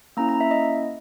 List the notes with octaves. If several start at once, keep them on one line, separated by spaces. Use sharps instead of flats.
A#3 C#4 E4 A#5
A#5
E5
D#5